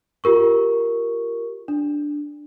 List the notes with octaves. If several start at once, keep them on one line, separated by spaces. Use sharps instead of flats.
F4 G4 A#4 C#6
D4